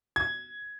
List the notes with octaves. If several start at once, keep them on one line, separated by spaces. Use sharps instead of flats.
G#6